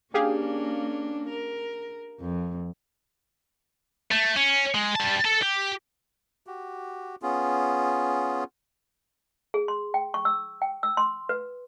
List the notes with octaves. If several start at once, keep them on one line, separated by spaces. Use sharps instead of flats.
A#3 C#4 D4 G4 G#4 F5
A#4
F2
A3
C#4
G#3
G3 A5
A4 A5
G4
F#4 G4
B3 C#4 F4 G#4
G#4
C6
G5
C#6
E6
G5
E6
C6
B4